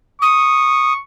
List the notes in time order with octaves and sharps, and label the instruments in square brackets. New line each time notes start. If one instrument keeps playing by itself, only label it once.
[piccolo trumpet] C#6 [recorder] D#6